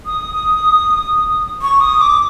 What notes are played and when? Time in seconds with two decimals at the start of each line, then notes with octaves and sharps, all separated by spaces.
0.06 D#6
1.62 C#6
1.81 D#6
2.01 D6